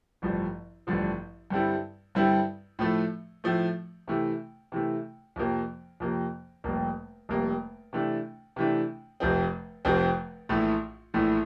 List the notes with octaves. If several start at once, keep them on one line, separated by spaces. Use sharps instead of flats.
A1 G2 D3 F3
A1 G2 D3 F3
G2 D3 G3 C4 E4
G2 D3 G3 C4 E4
A2 F3 A3
A2 F3 A3
C3 E3 A3
C3 E3 A3
F2 C3 F3 A#3
F2 C3 F3 A#3
F1 F2 C3 G3 A#3
F1 F2 C3 G3 A#3
C3 E3 A3 D4
C3 E3 A3 D4
F1 F2 C3 F3 C4
F1 F2 C3 F3 C4
A#1 A2 E3 A3
A#1 A2 E3 A3